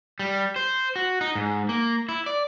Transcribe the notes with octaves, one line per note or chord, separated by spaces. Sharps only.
G3
C5
F#4
D#4
G#2
A#3
E4
D5